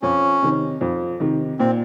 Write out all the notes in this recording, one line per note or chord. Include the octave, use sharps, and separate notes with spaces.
F2 C#4
C3 D#3
F2
C3 D#3
A#2 C4